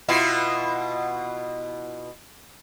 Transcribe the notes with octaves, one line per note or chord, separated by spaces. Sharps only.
B2 E4 F4